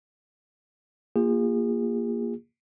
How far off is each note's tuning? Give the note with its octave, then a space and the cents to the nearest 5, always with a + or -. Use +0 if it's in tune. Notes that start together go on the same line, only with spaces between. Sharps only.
A#3 +5 F4 +0 G#4 -35